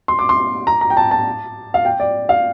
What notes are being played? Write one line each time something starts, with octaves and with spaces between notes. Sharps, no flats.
C6
D6
C6
A#5
A#5
G5
A5
A5
F5
G5
D5
F5